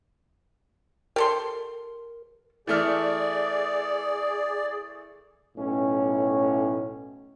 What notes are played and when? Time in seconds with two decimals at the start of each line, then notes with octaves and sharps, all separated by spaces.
1.16 G4 A4 A#4 C6
2.67 E3 A3 G#4 D5 F6
5.56 B1 A2 C#4